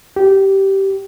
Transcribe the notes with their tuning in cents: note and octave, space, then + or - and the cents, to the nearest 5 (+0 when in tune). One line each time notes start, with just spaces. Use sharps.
G4 -15